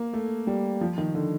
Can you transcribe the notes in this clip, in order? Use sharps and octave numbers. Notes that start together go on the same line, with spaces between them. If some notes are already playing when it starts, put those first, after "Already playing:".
Already playing: A#3
A3
G3
F3
D#3
D3